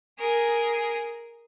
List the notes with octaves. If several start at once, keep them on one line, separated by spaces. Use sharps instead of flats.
G#4 A#4